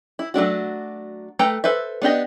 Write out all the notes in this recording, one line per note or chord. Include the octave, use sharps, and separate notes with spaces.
E4
F#3 A3 D4 F#4
A3 A4 B4 G5 A#5
A4 B4 C5 E5
B3 D4 G4 D#5